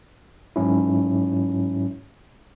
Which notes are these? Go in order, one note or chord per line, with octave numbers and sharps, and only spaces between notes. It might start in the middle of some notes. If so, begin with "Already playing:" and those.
G#2 F#3 C#4 E4